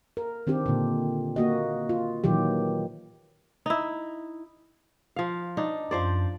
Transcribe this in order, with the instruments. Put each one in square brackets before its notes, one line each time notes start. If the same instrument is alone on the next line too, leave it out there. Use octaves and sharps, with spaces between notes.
[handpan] A#4
D#3 C4 D4 G4
A#2 D3
A#3 F#4 D#5
F4
A#2 D#3 E3 F#3 G4
[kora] D#4 E4
F3 F5
D4 D#4
[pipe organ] F#2 [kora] F3 C5 D5